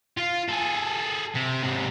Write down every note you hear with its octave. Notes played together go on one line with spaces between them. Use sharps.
F4
G#4 A4
C3
G#2 C3